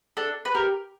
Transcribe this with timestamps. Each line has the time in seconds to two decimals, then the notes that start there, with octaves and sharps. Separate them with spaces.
0.17 D4 A4
0.45 B4
0.54 G4 A#4